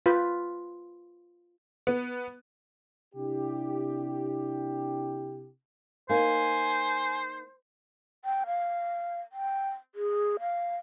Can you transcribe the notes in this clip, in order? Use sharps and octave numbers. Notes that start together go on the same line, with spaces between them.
F4 B4
B3
C3 D4 E4 G4
A#3 D#4 C5 G#5
G5
F5
G5
G#4
F5